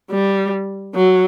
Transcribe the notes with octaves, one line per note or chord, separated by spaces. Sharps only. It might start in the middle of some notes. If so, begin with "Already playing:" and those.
G3
F#3